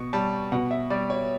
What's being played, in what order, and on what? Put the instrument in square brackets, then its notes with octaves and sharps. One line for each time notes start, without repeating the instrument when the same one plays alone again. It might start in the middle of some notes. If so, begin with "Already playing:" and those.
Already playing: [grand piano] B2 C#6
G3 A5
B2 F#5
E5
G3 D5
C#5